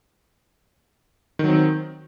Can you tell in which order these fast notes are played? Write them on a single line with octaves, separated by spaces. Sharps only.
D#3 F#3 C4